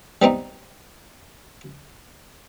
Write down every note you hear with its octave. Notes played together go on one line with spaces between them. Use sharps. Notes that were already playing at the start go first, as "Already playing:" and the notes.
G3 B3 C4 D#4